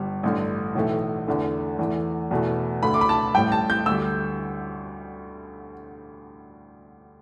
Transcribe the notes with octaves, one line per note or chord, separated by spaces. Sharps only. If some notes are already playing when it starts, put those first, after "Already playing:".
Already playing: G1 G3
A1 G2 D3
B1 A2 E3 A3
E2 D3 A3
E2 E3 A3
E2 B2 A3
D2 D3 A3 B5
D6
B5
A5
A1 A2 G3 G5
A5
G6
D2 D3 G3 E6